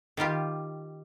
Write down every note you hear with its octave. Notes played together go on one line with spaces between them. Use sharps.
D#3 G3 F4 G4